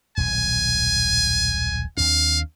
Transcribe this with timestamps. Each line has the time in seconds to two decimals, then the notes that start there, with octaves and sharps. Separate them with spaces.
0.17 D#1 B1 B2 G#5
1.97 D#2 C4 D4 F5